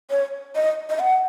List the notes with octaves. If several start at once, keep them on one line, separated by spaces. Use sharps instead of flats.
C#5
D#5
D#5
F#5